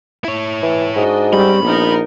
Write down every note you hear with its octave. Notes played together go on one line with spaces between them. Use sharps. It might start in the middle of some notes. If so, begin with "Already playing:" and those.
E4 C#5
E3
G#2 D4 F#4 D#5
G3 C4 C#4 B5
A#1 B3 D#4 A#4